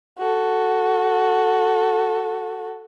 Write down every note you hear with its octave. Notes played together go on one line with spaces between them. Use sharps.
F#4 A4